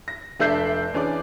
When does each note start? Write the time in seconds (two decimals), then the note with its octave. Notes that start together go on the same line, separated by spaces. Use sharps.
0.08 A#6
0.40 F1 D4 A4 E5 G6 C7
0.94 E3 C#4 D4 G#4 D5 D6